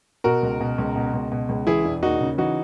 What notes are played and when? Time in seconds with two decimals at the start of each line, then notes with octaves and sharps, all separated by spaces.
0.24 B2 F#4 A#4
0.43 C#2
0.60 B2
0.78 C#2
0.96 B2
1.13 C#2
1.32 B2
1.49 C#2
1.67 E3 E4 G#4
1.85 E1
2.03 D#2 D#4 F#4
2.21 C#3
2.38 E3 D#4 F#4